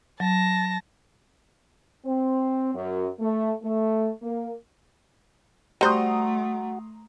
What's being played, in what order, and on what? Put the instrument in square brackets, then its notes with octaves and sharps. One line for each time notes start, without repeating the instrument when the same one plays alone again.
[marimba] F#3 [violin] A5 A#6
[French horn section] C4
F#2
A3
A3
A#3
[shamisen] G3 C5 [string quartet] A3 [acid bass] F#4 [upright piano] A#5 C6 D#6